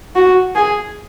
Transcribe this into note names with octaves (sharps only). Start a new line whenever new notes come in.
F#4
G#4